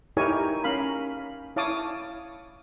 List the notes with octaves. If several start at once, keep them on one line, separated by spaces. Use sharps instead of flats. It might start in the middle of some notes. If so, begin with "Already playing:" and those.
D#4 E4 G4 A#4 C#5 G#5
C#4 A#4 F5 B5
E4 C#5 F5 A5 D6 D#6